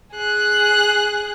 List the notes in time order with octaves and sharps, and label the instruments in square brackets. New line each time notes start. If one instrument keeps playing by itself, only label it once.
[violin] G#4 F#6